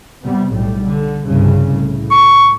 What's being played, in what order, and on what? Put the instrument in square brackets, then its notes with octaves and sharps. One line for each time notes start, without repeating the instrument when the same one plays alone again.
[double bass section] C3 G3 B3
B1 A2 G3
D3
C2 G2 C#3
A2
[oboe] C#6